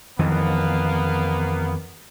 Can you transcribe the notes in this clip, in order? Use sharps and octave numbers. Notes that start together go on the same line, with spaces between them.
F2 D#3 E3 A#3 B3